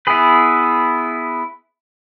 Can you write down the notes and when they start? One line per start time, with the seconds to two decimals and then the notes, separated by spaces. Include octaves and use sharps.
0.07 B3 E4 G#4 B4